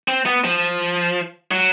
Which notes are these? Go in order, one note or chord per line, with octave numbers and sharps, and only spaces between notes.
C4
B3
F3
F#3